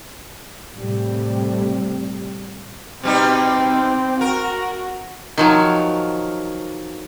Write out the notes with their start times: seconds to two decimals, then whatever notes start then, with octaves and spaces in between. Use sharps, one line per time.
0.76 A2 C3 G3
3.03 B2 G3 C4 D#4
4.21 F#4 A#4
5.38 D#3 F3 F#3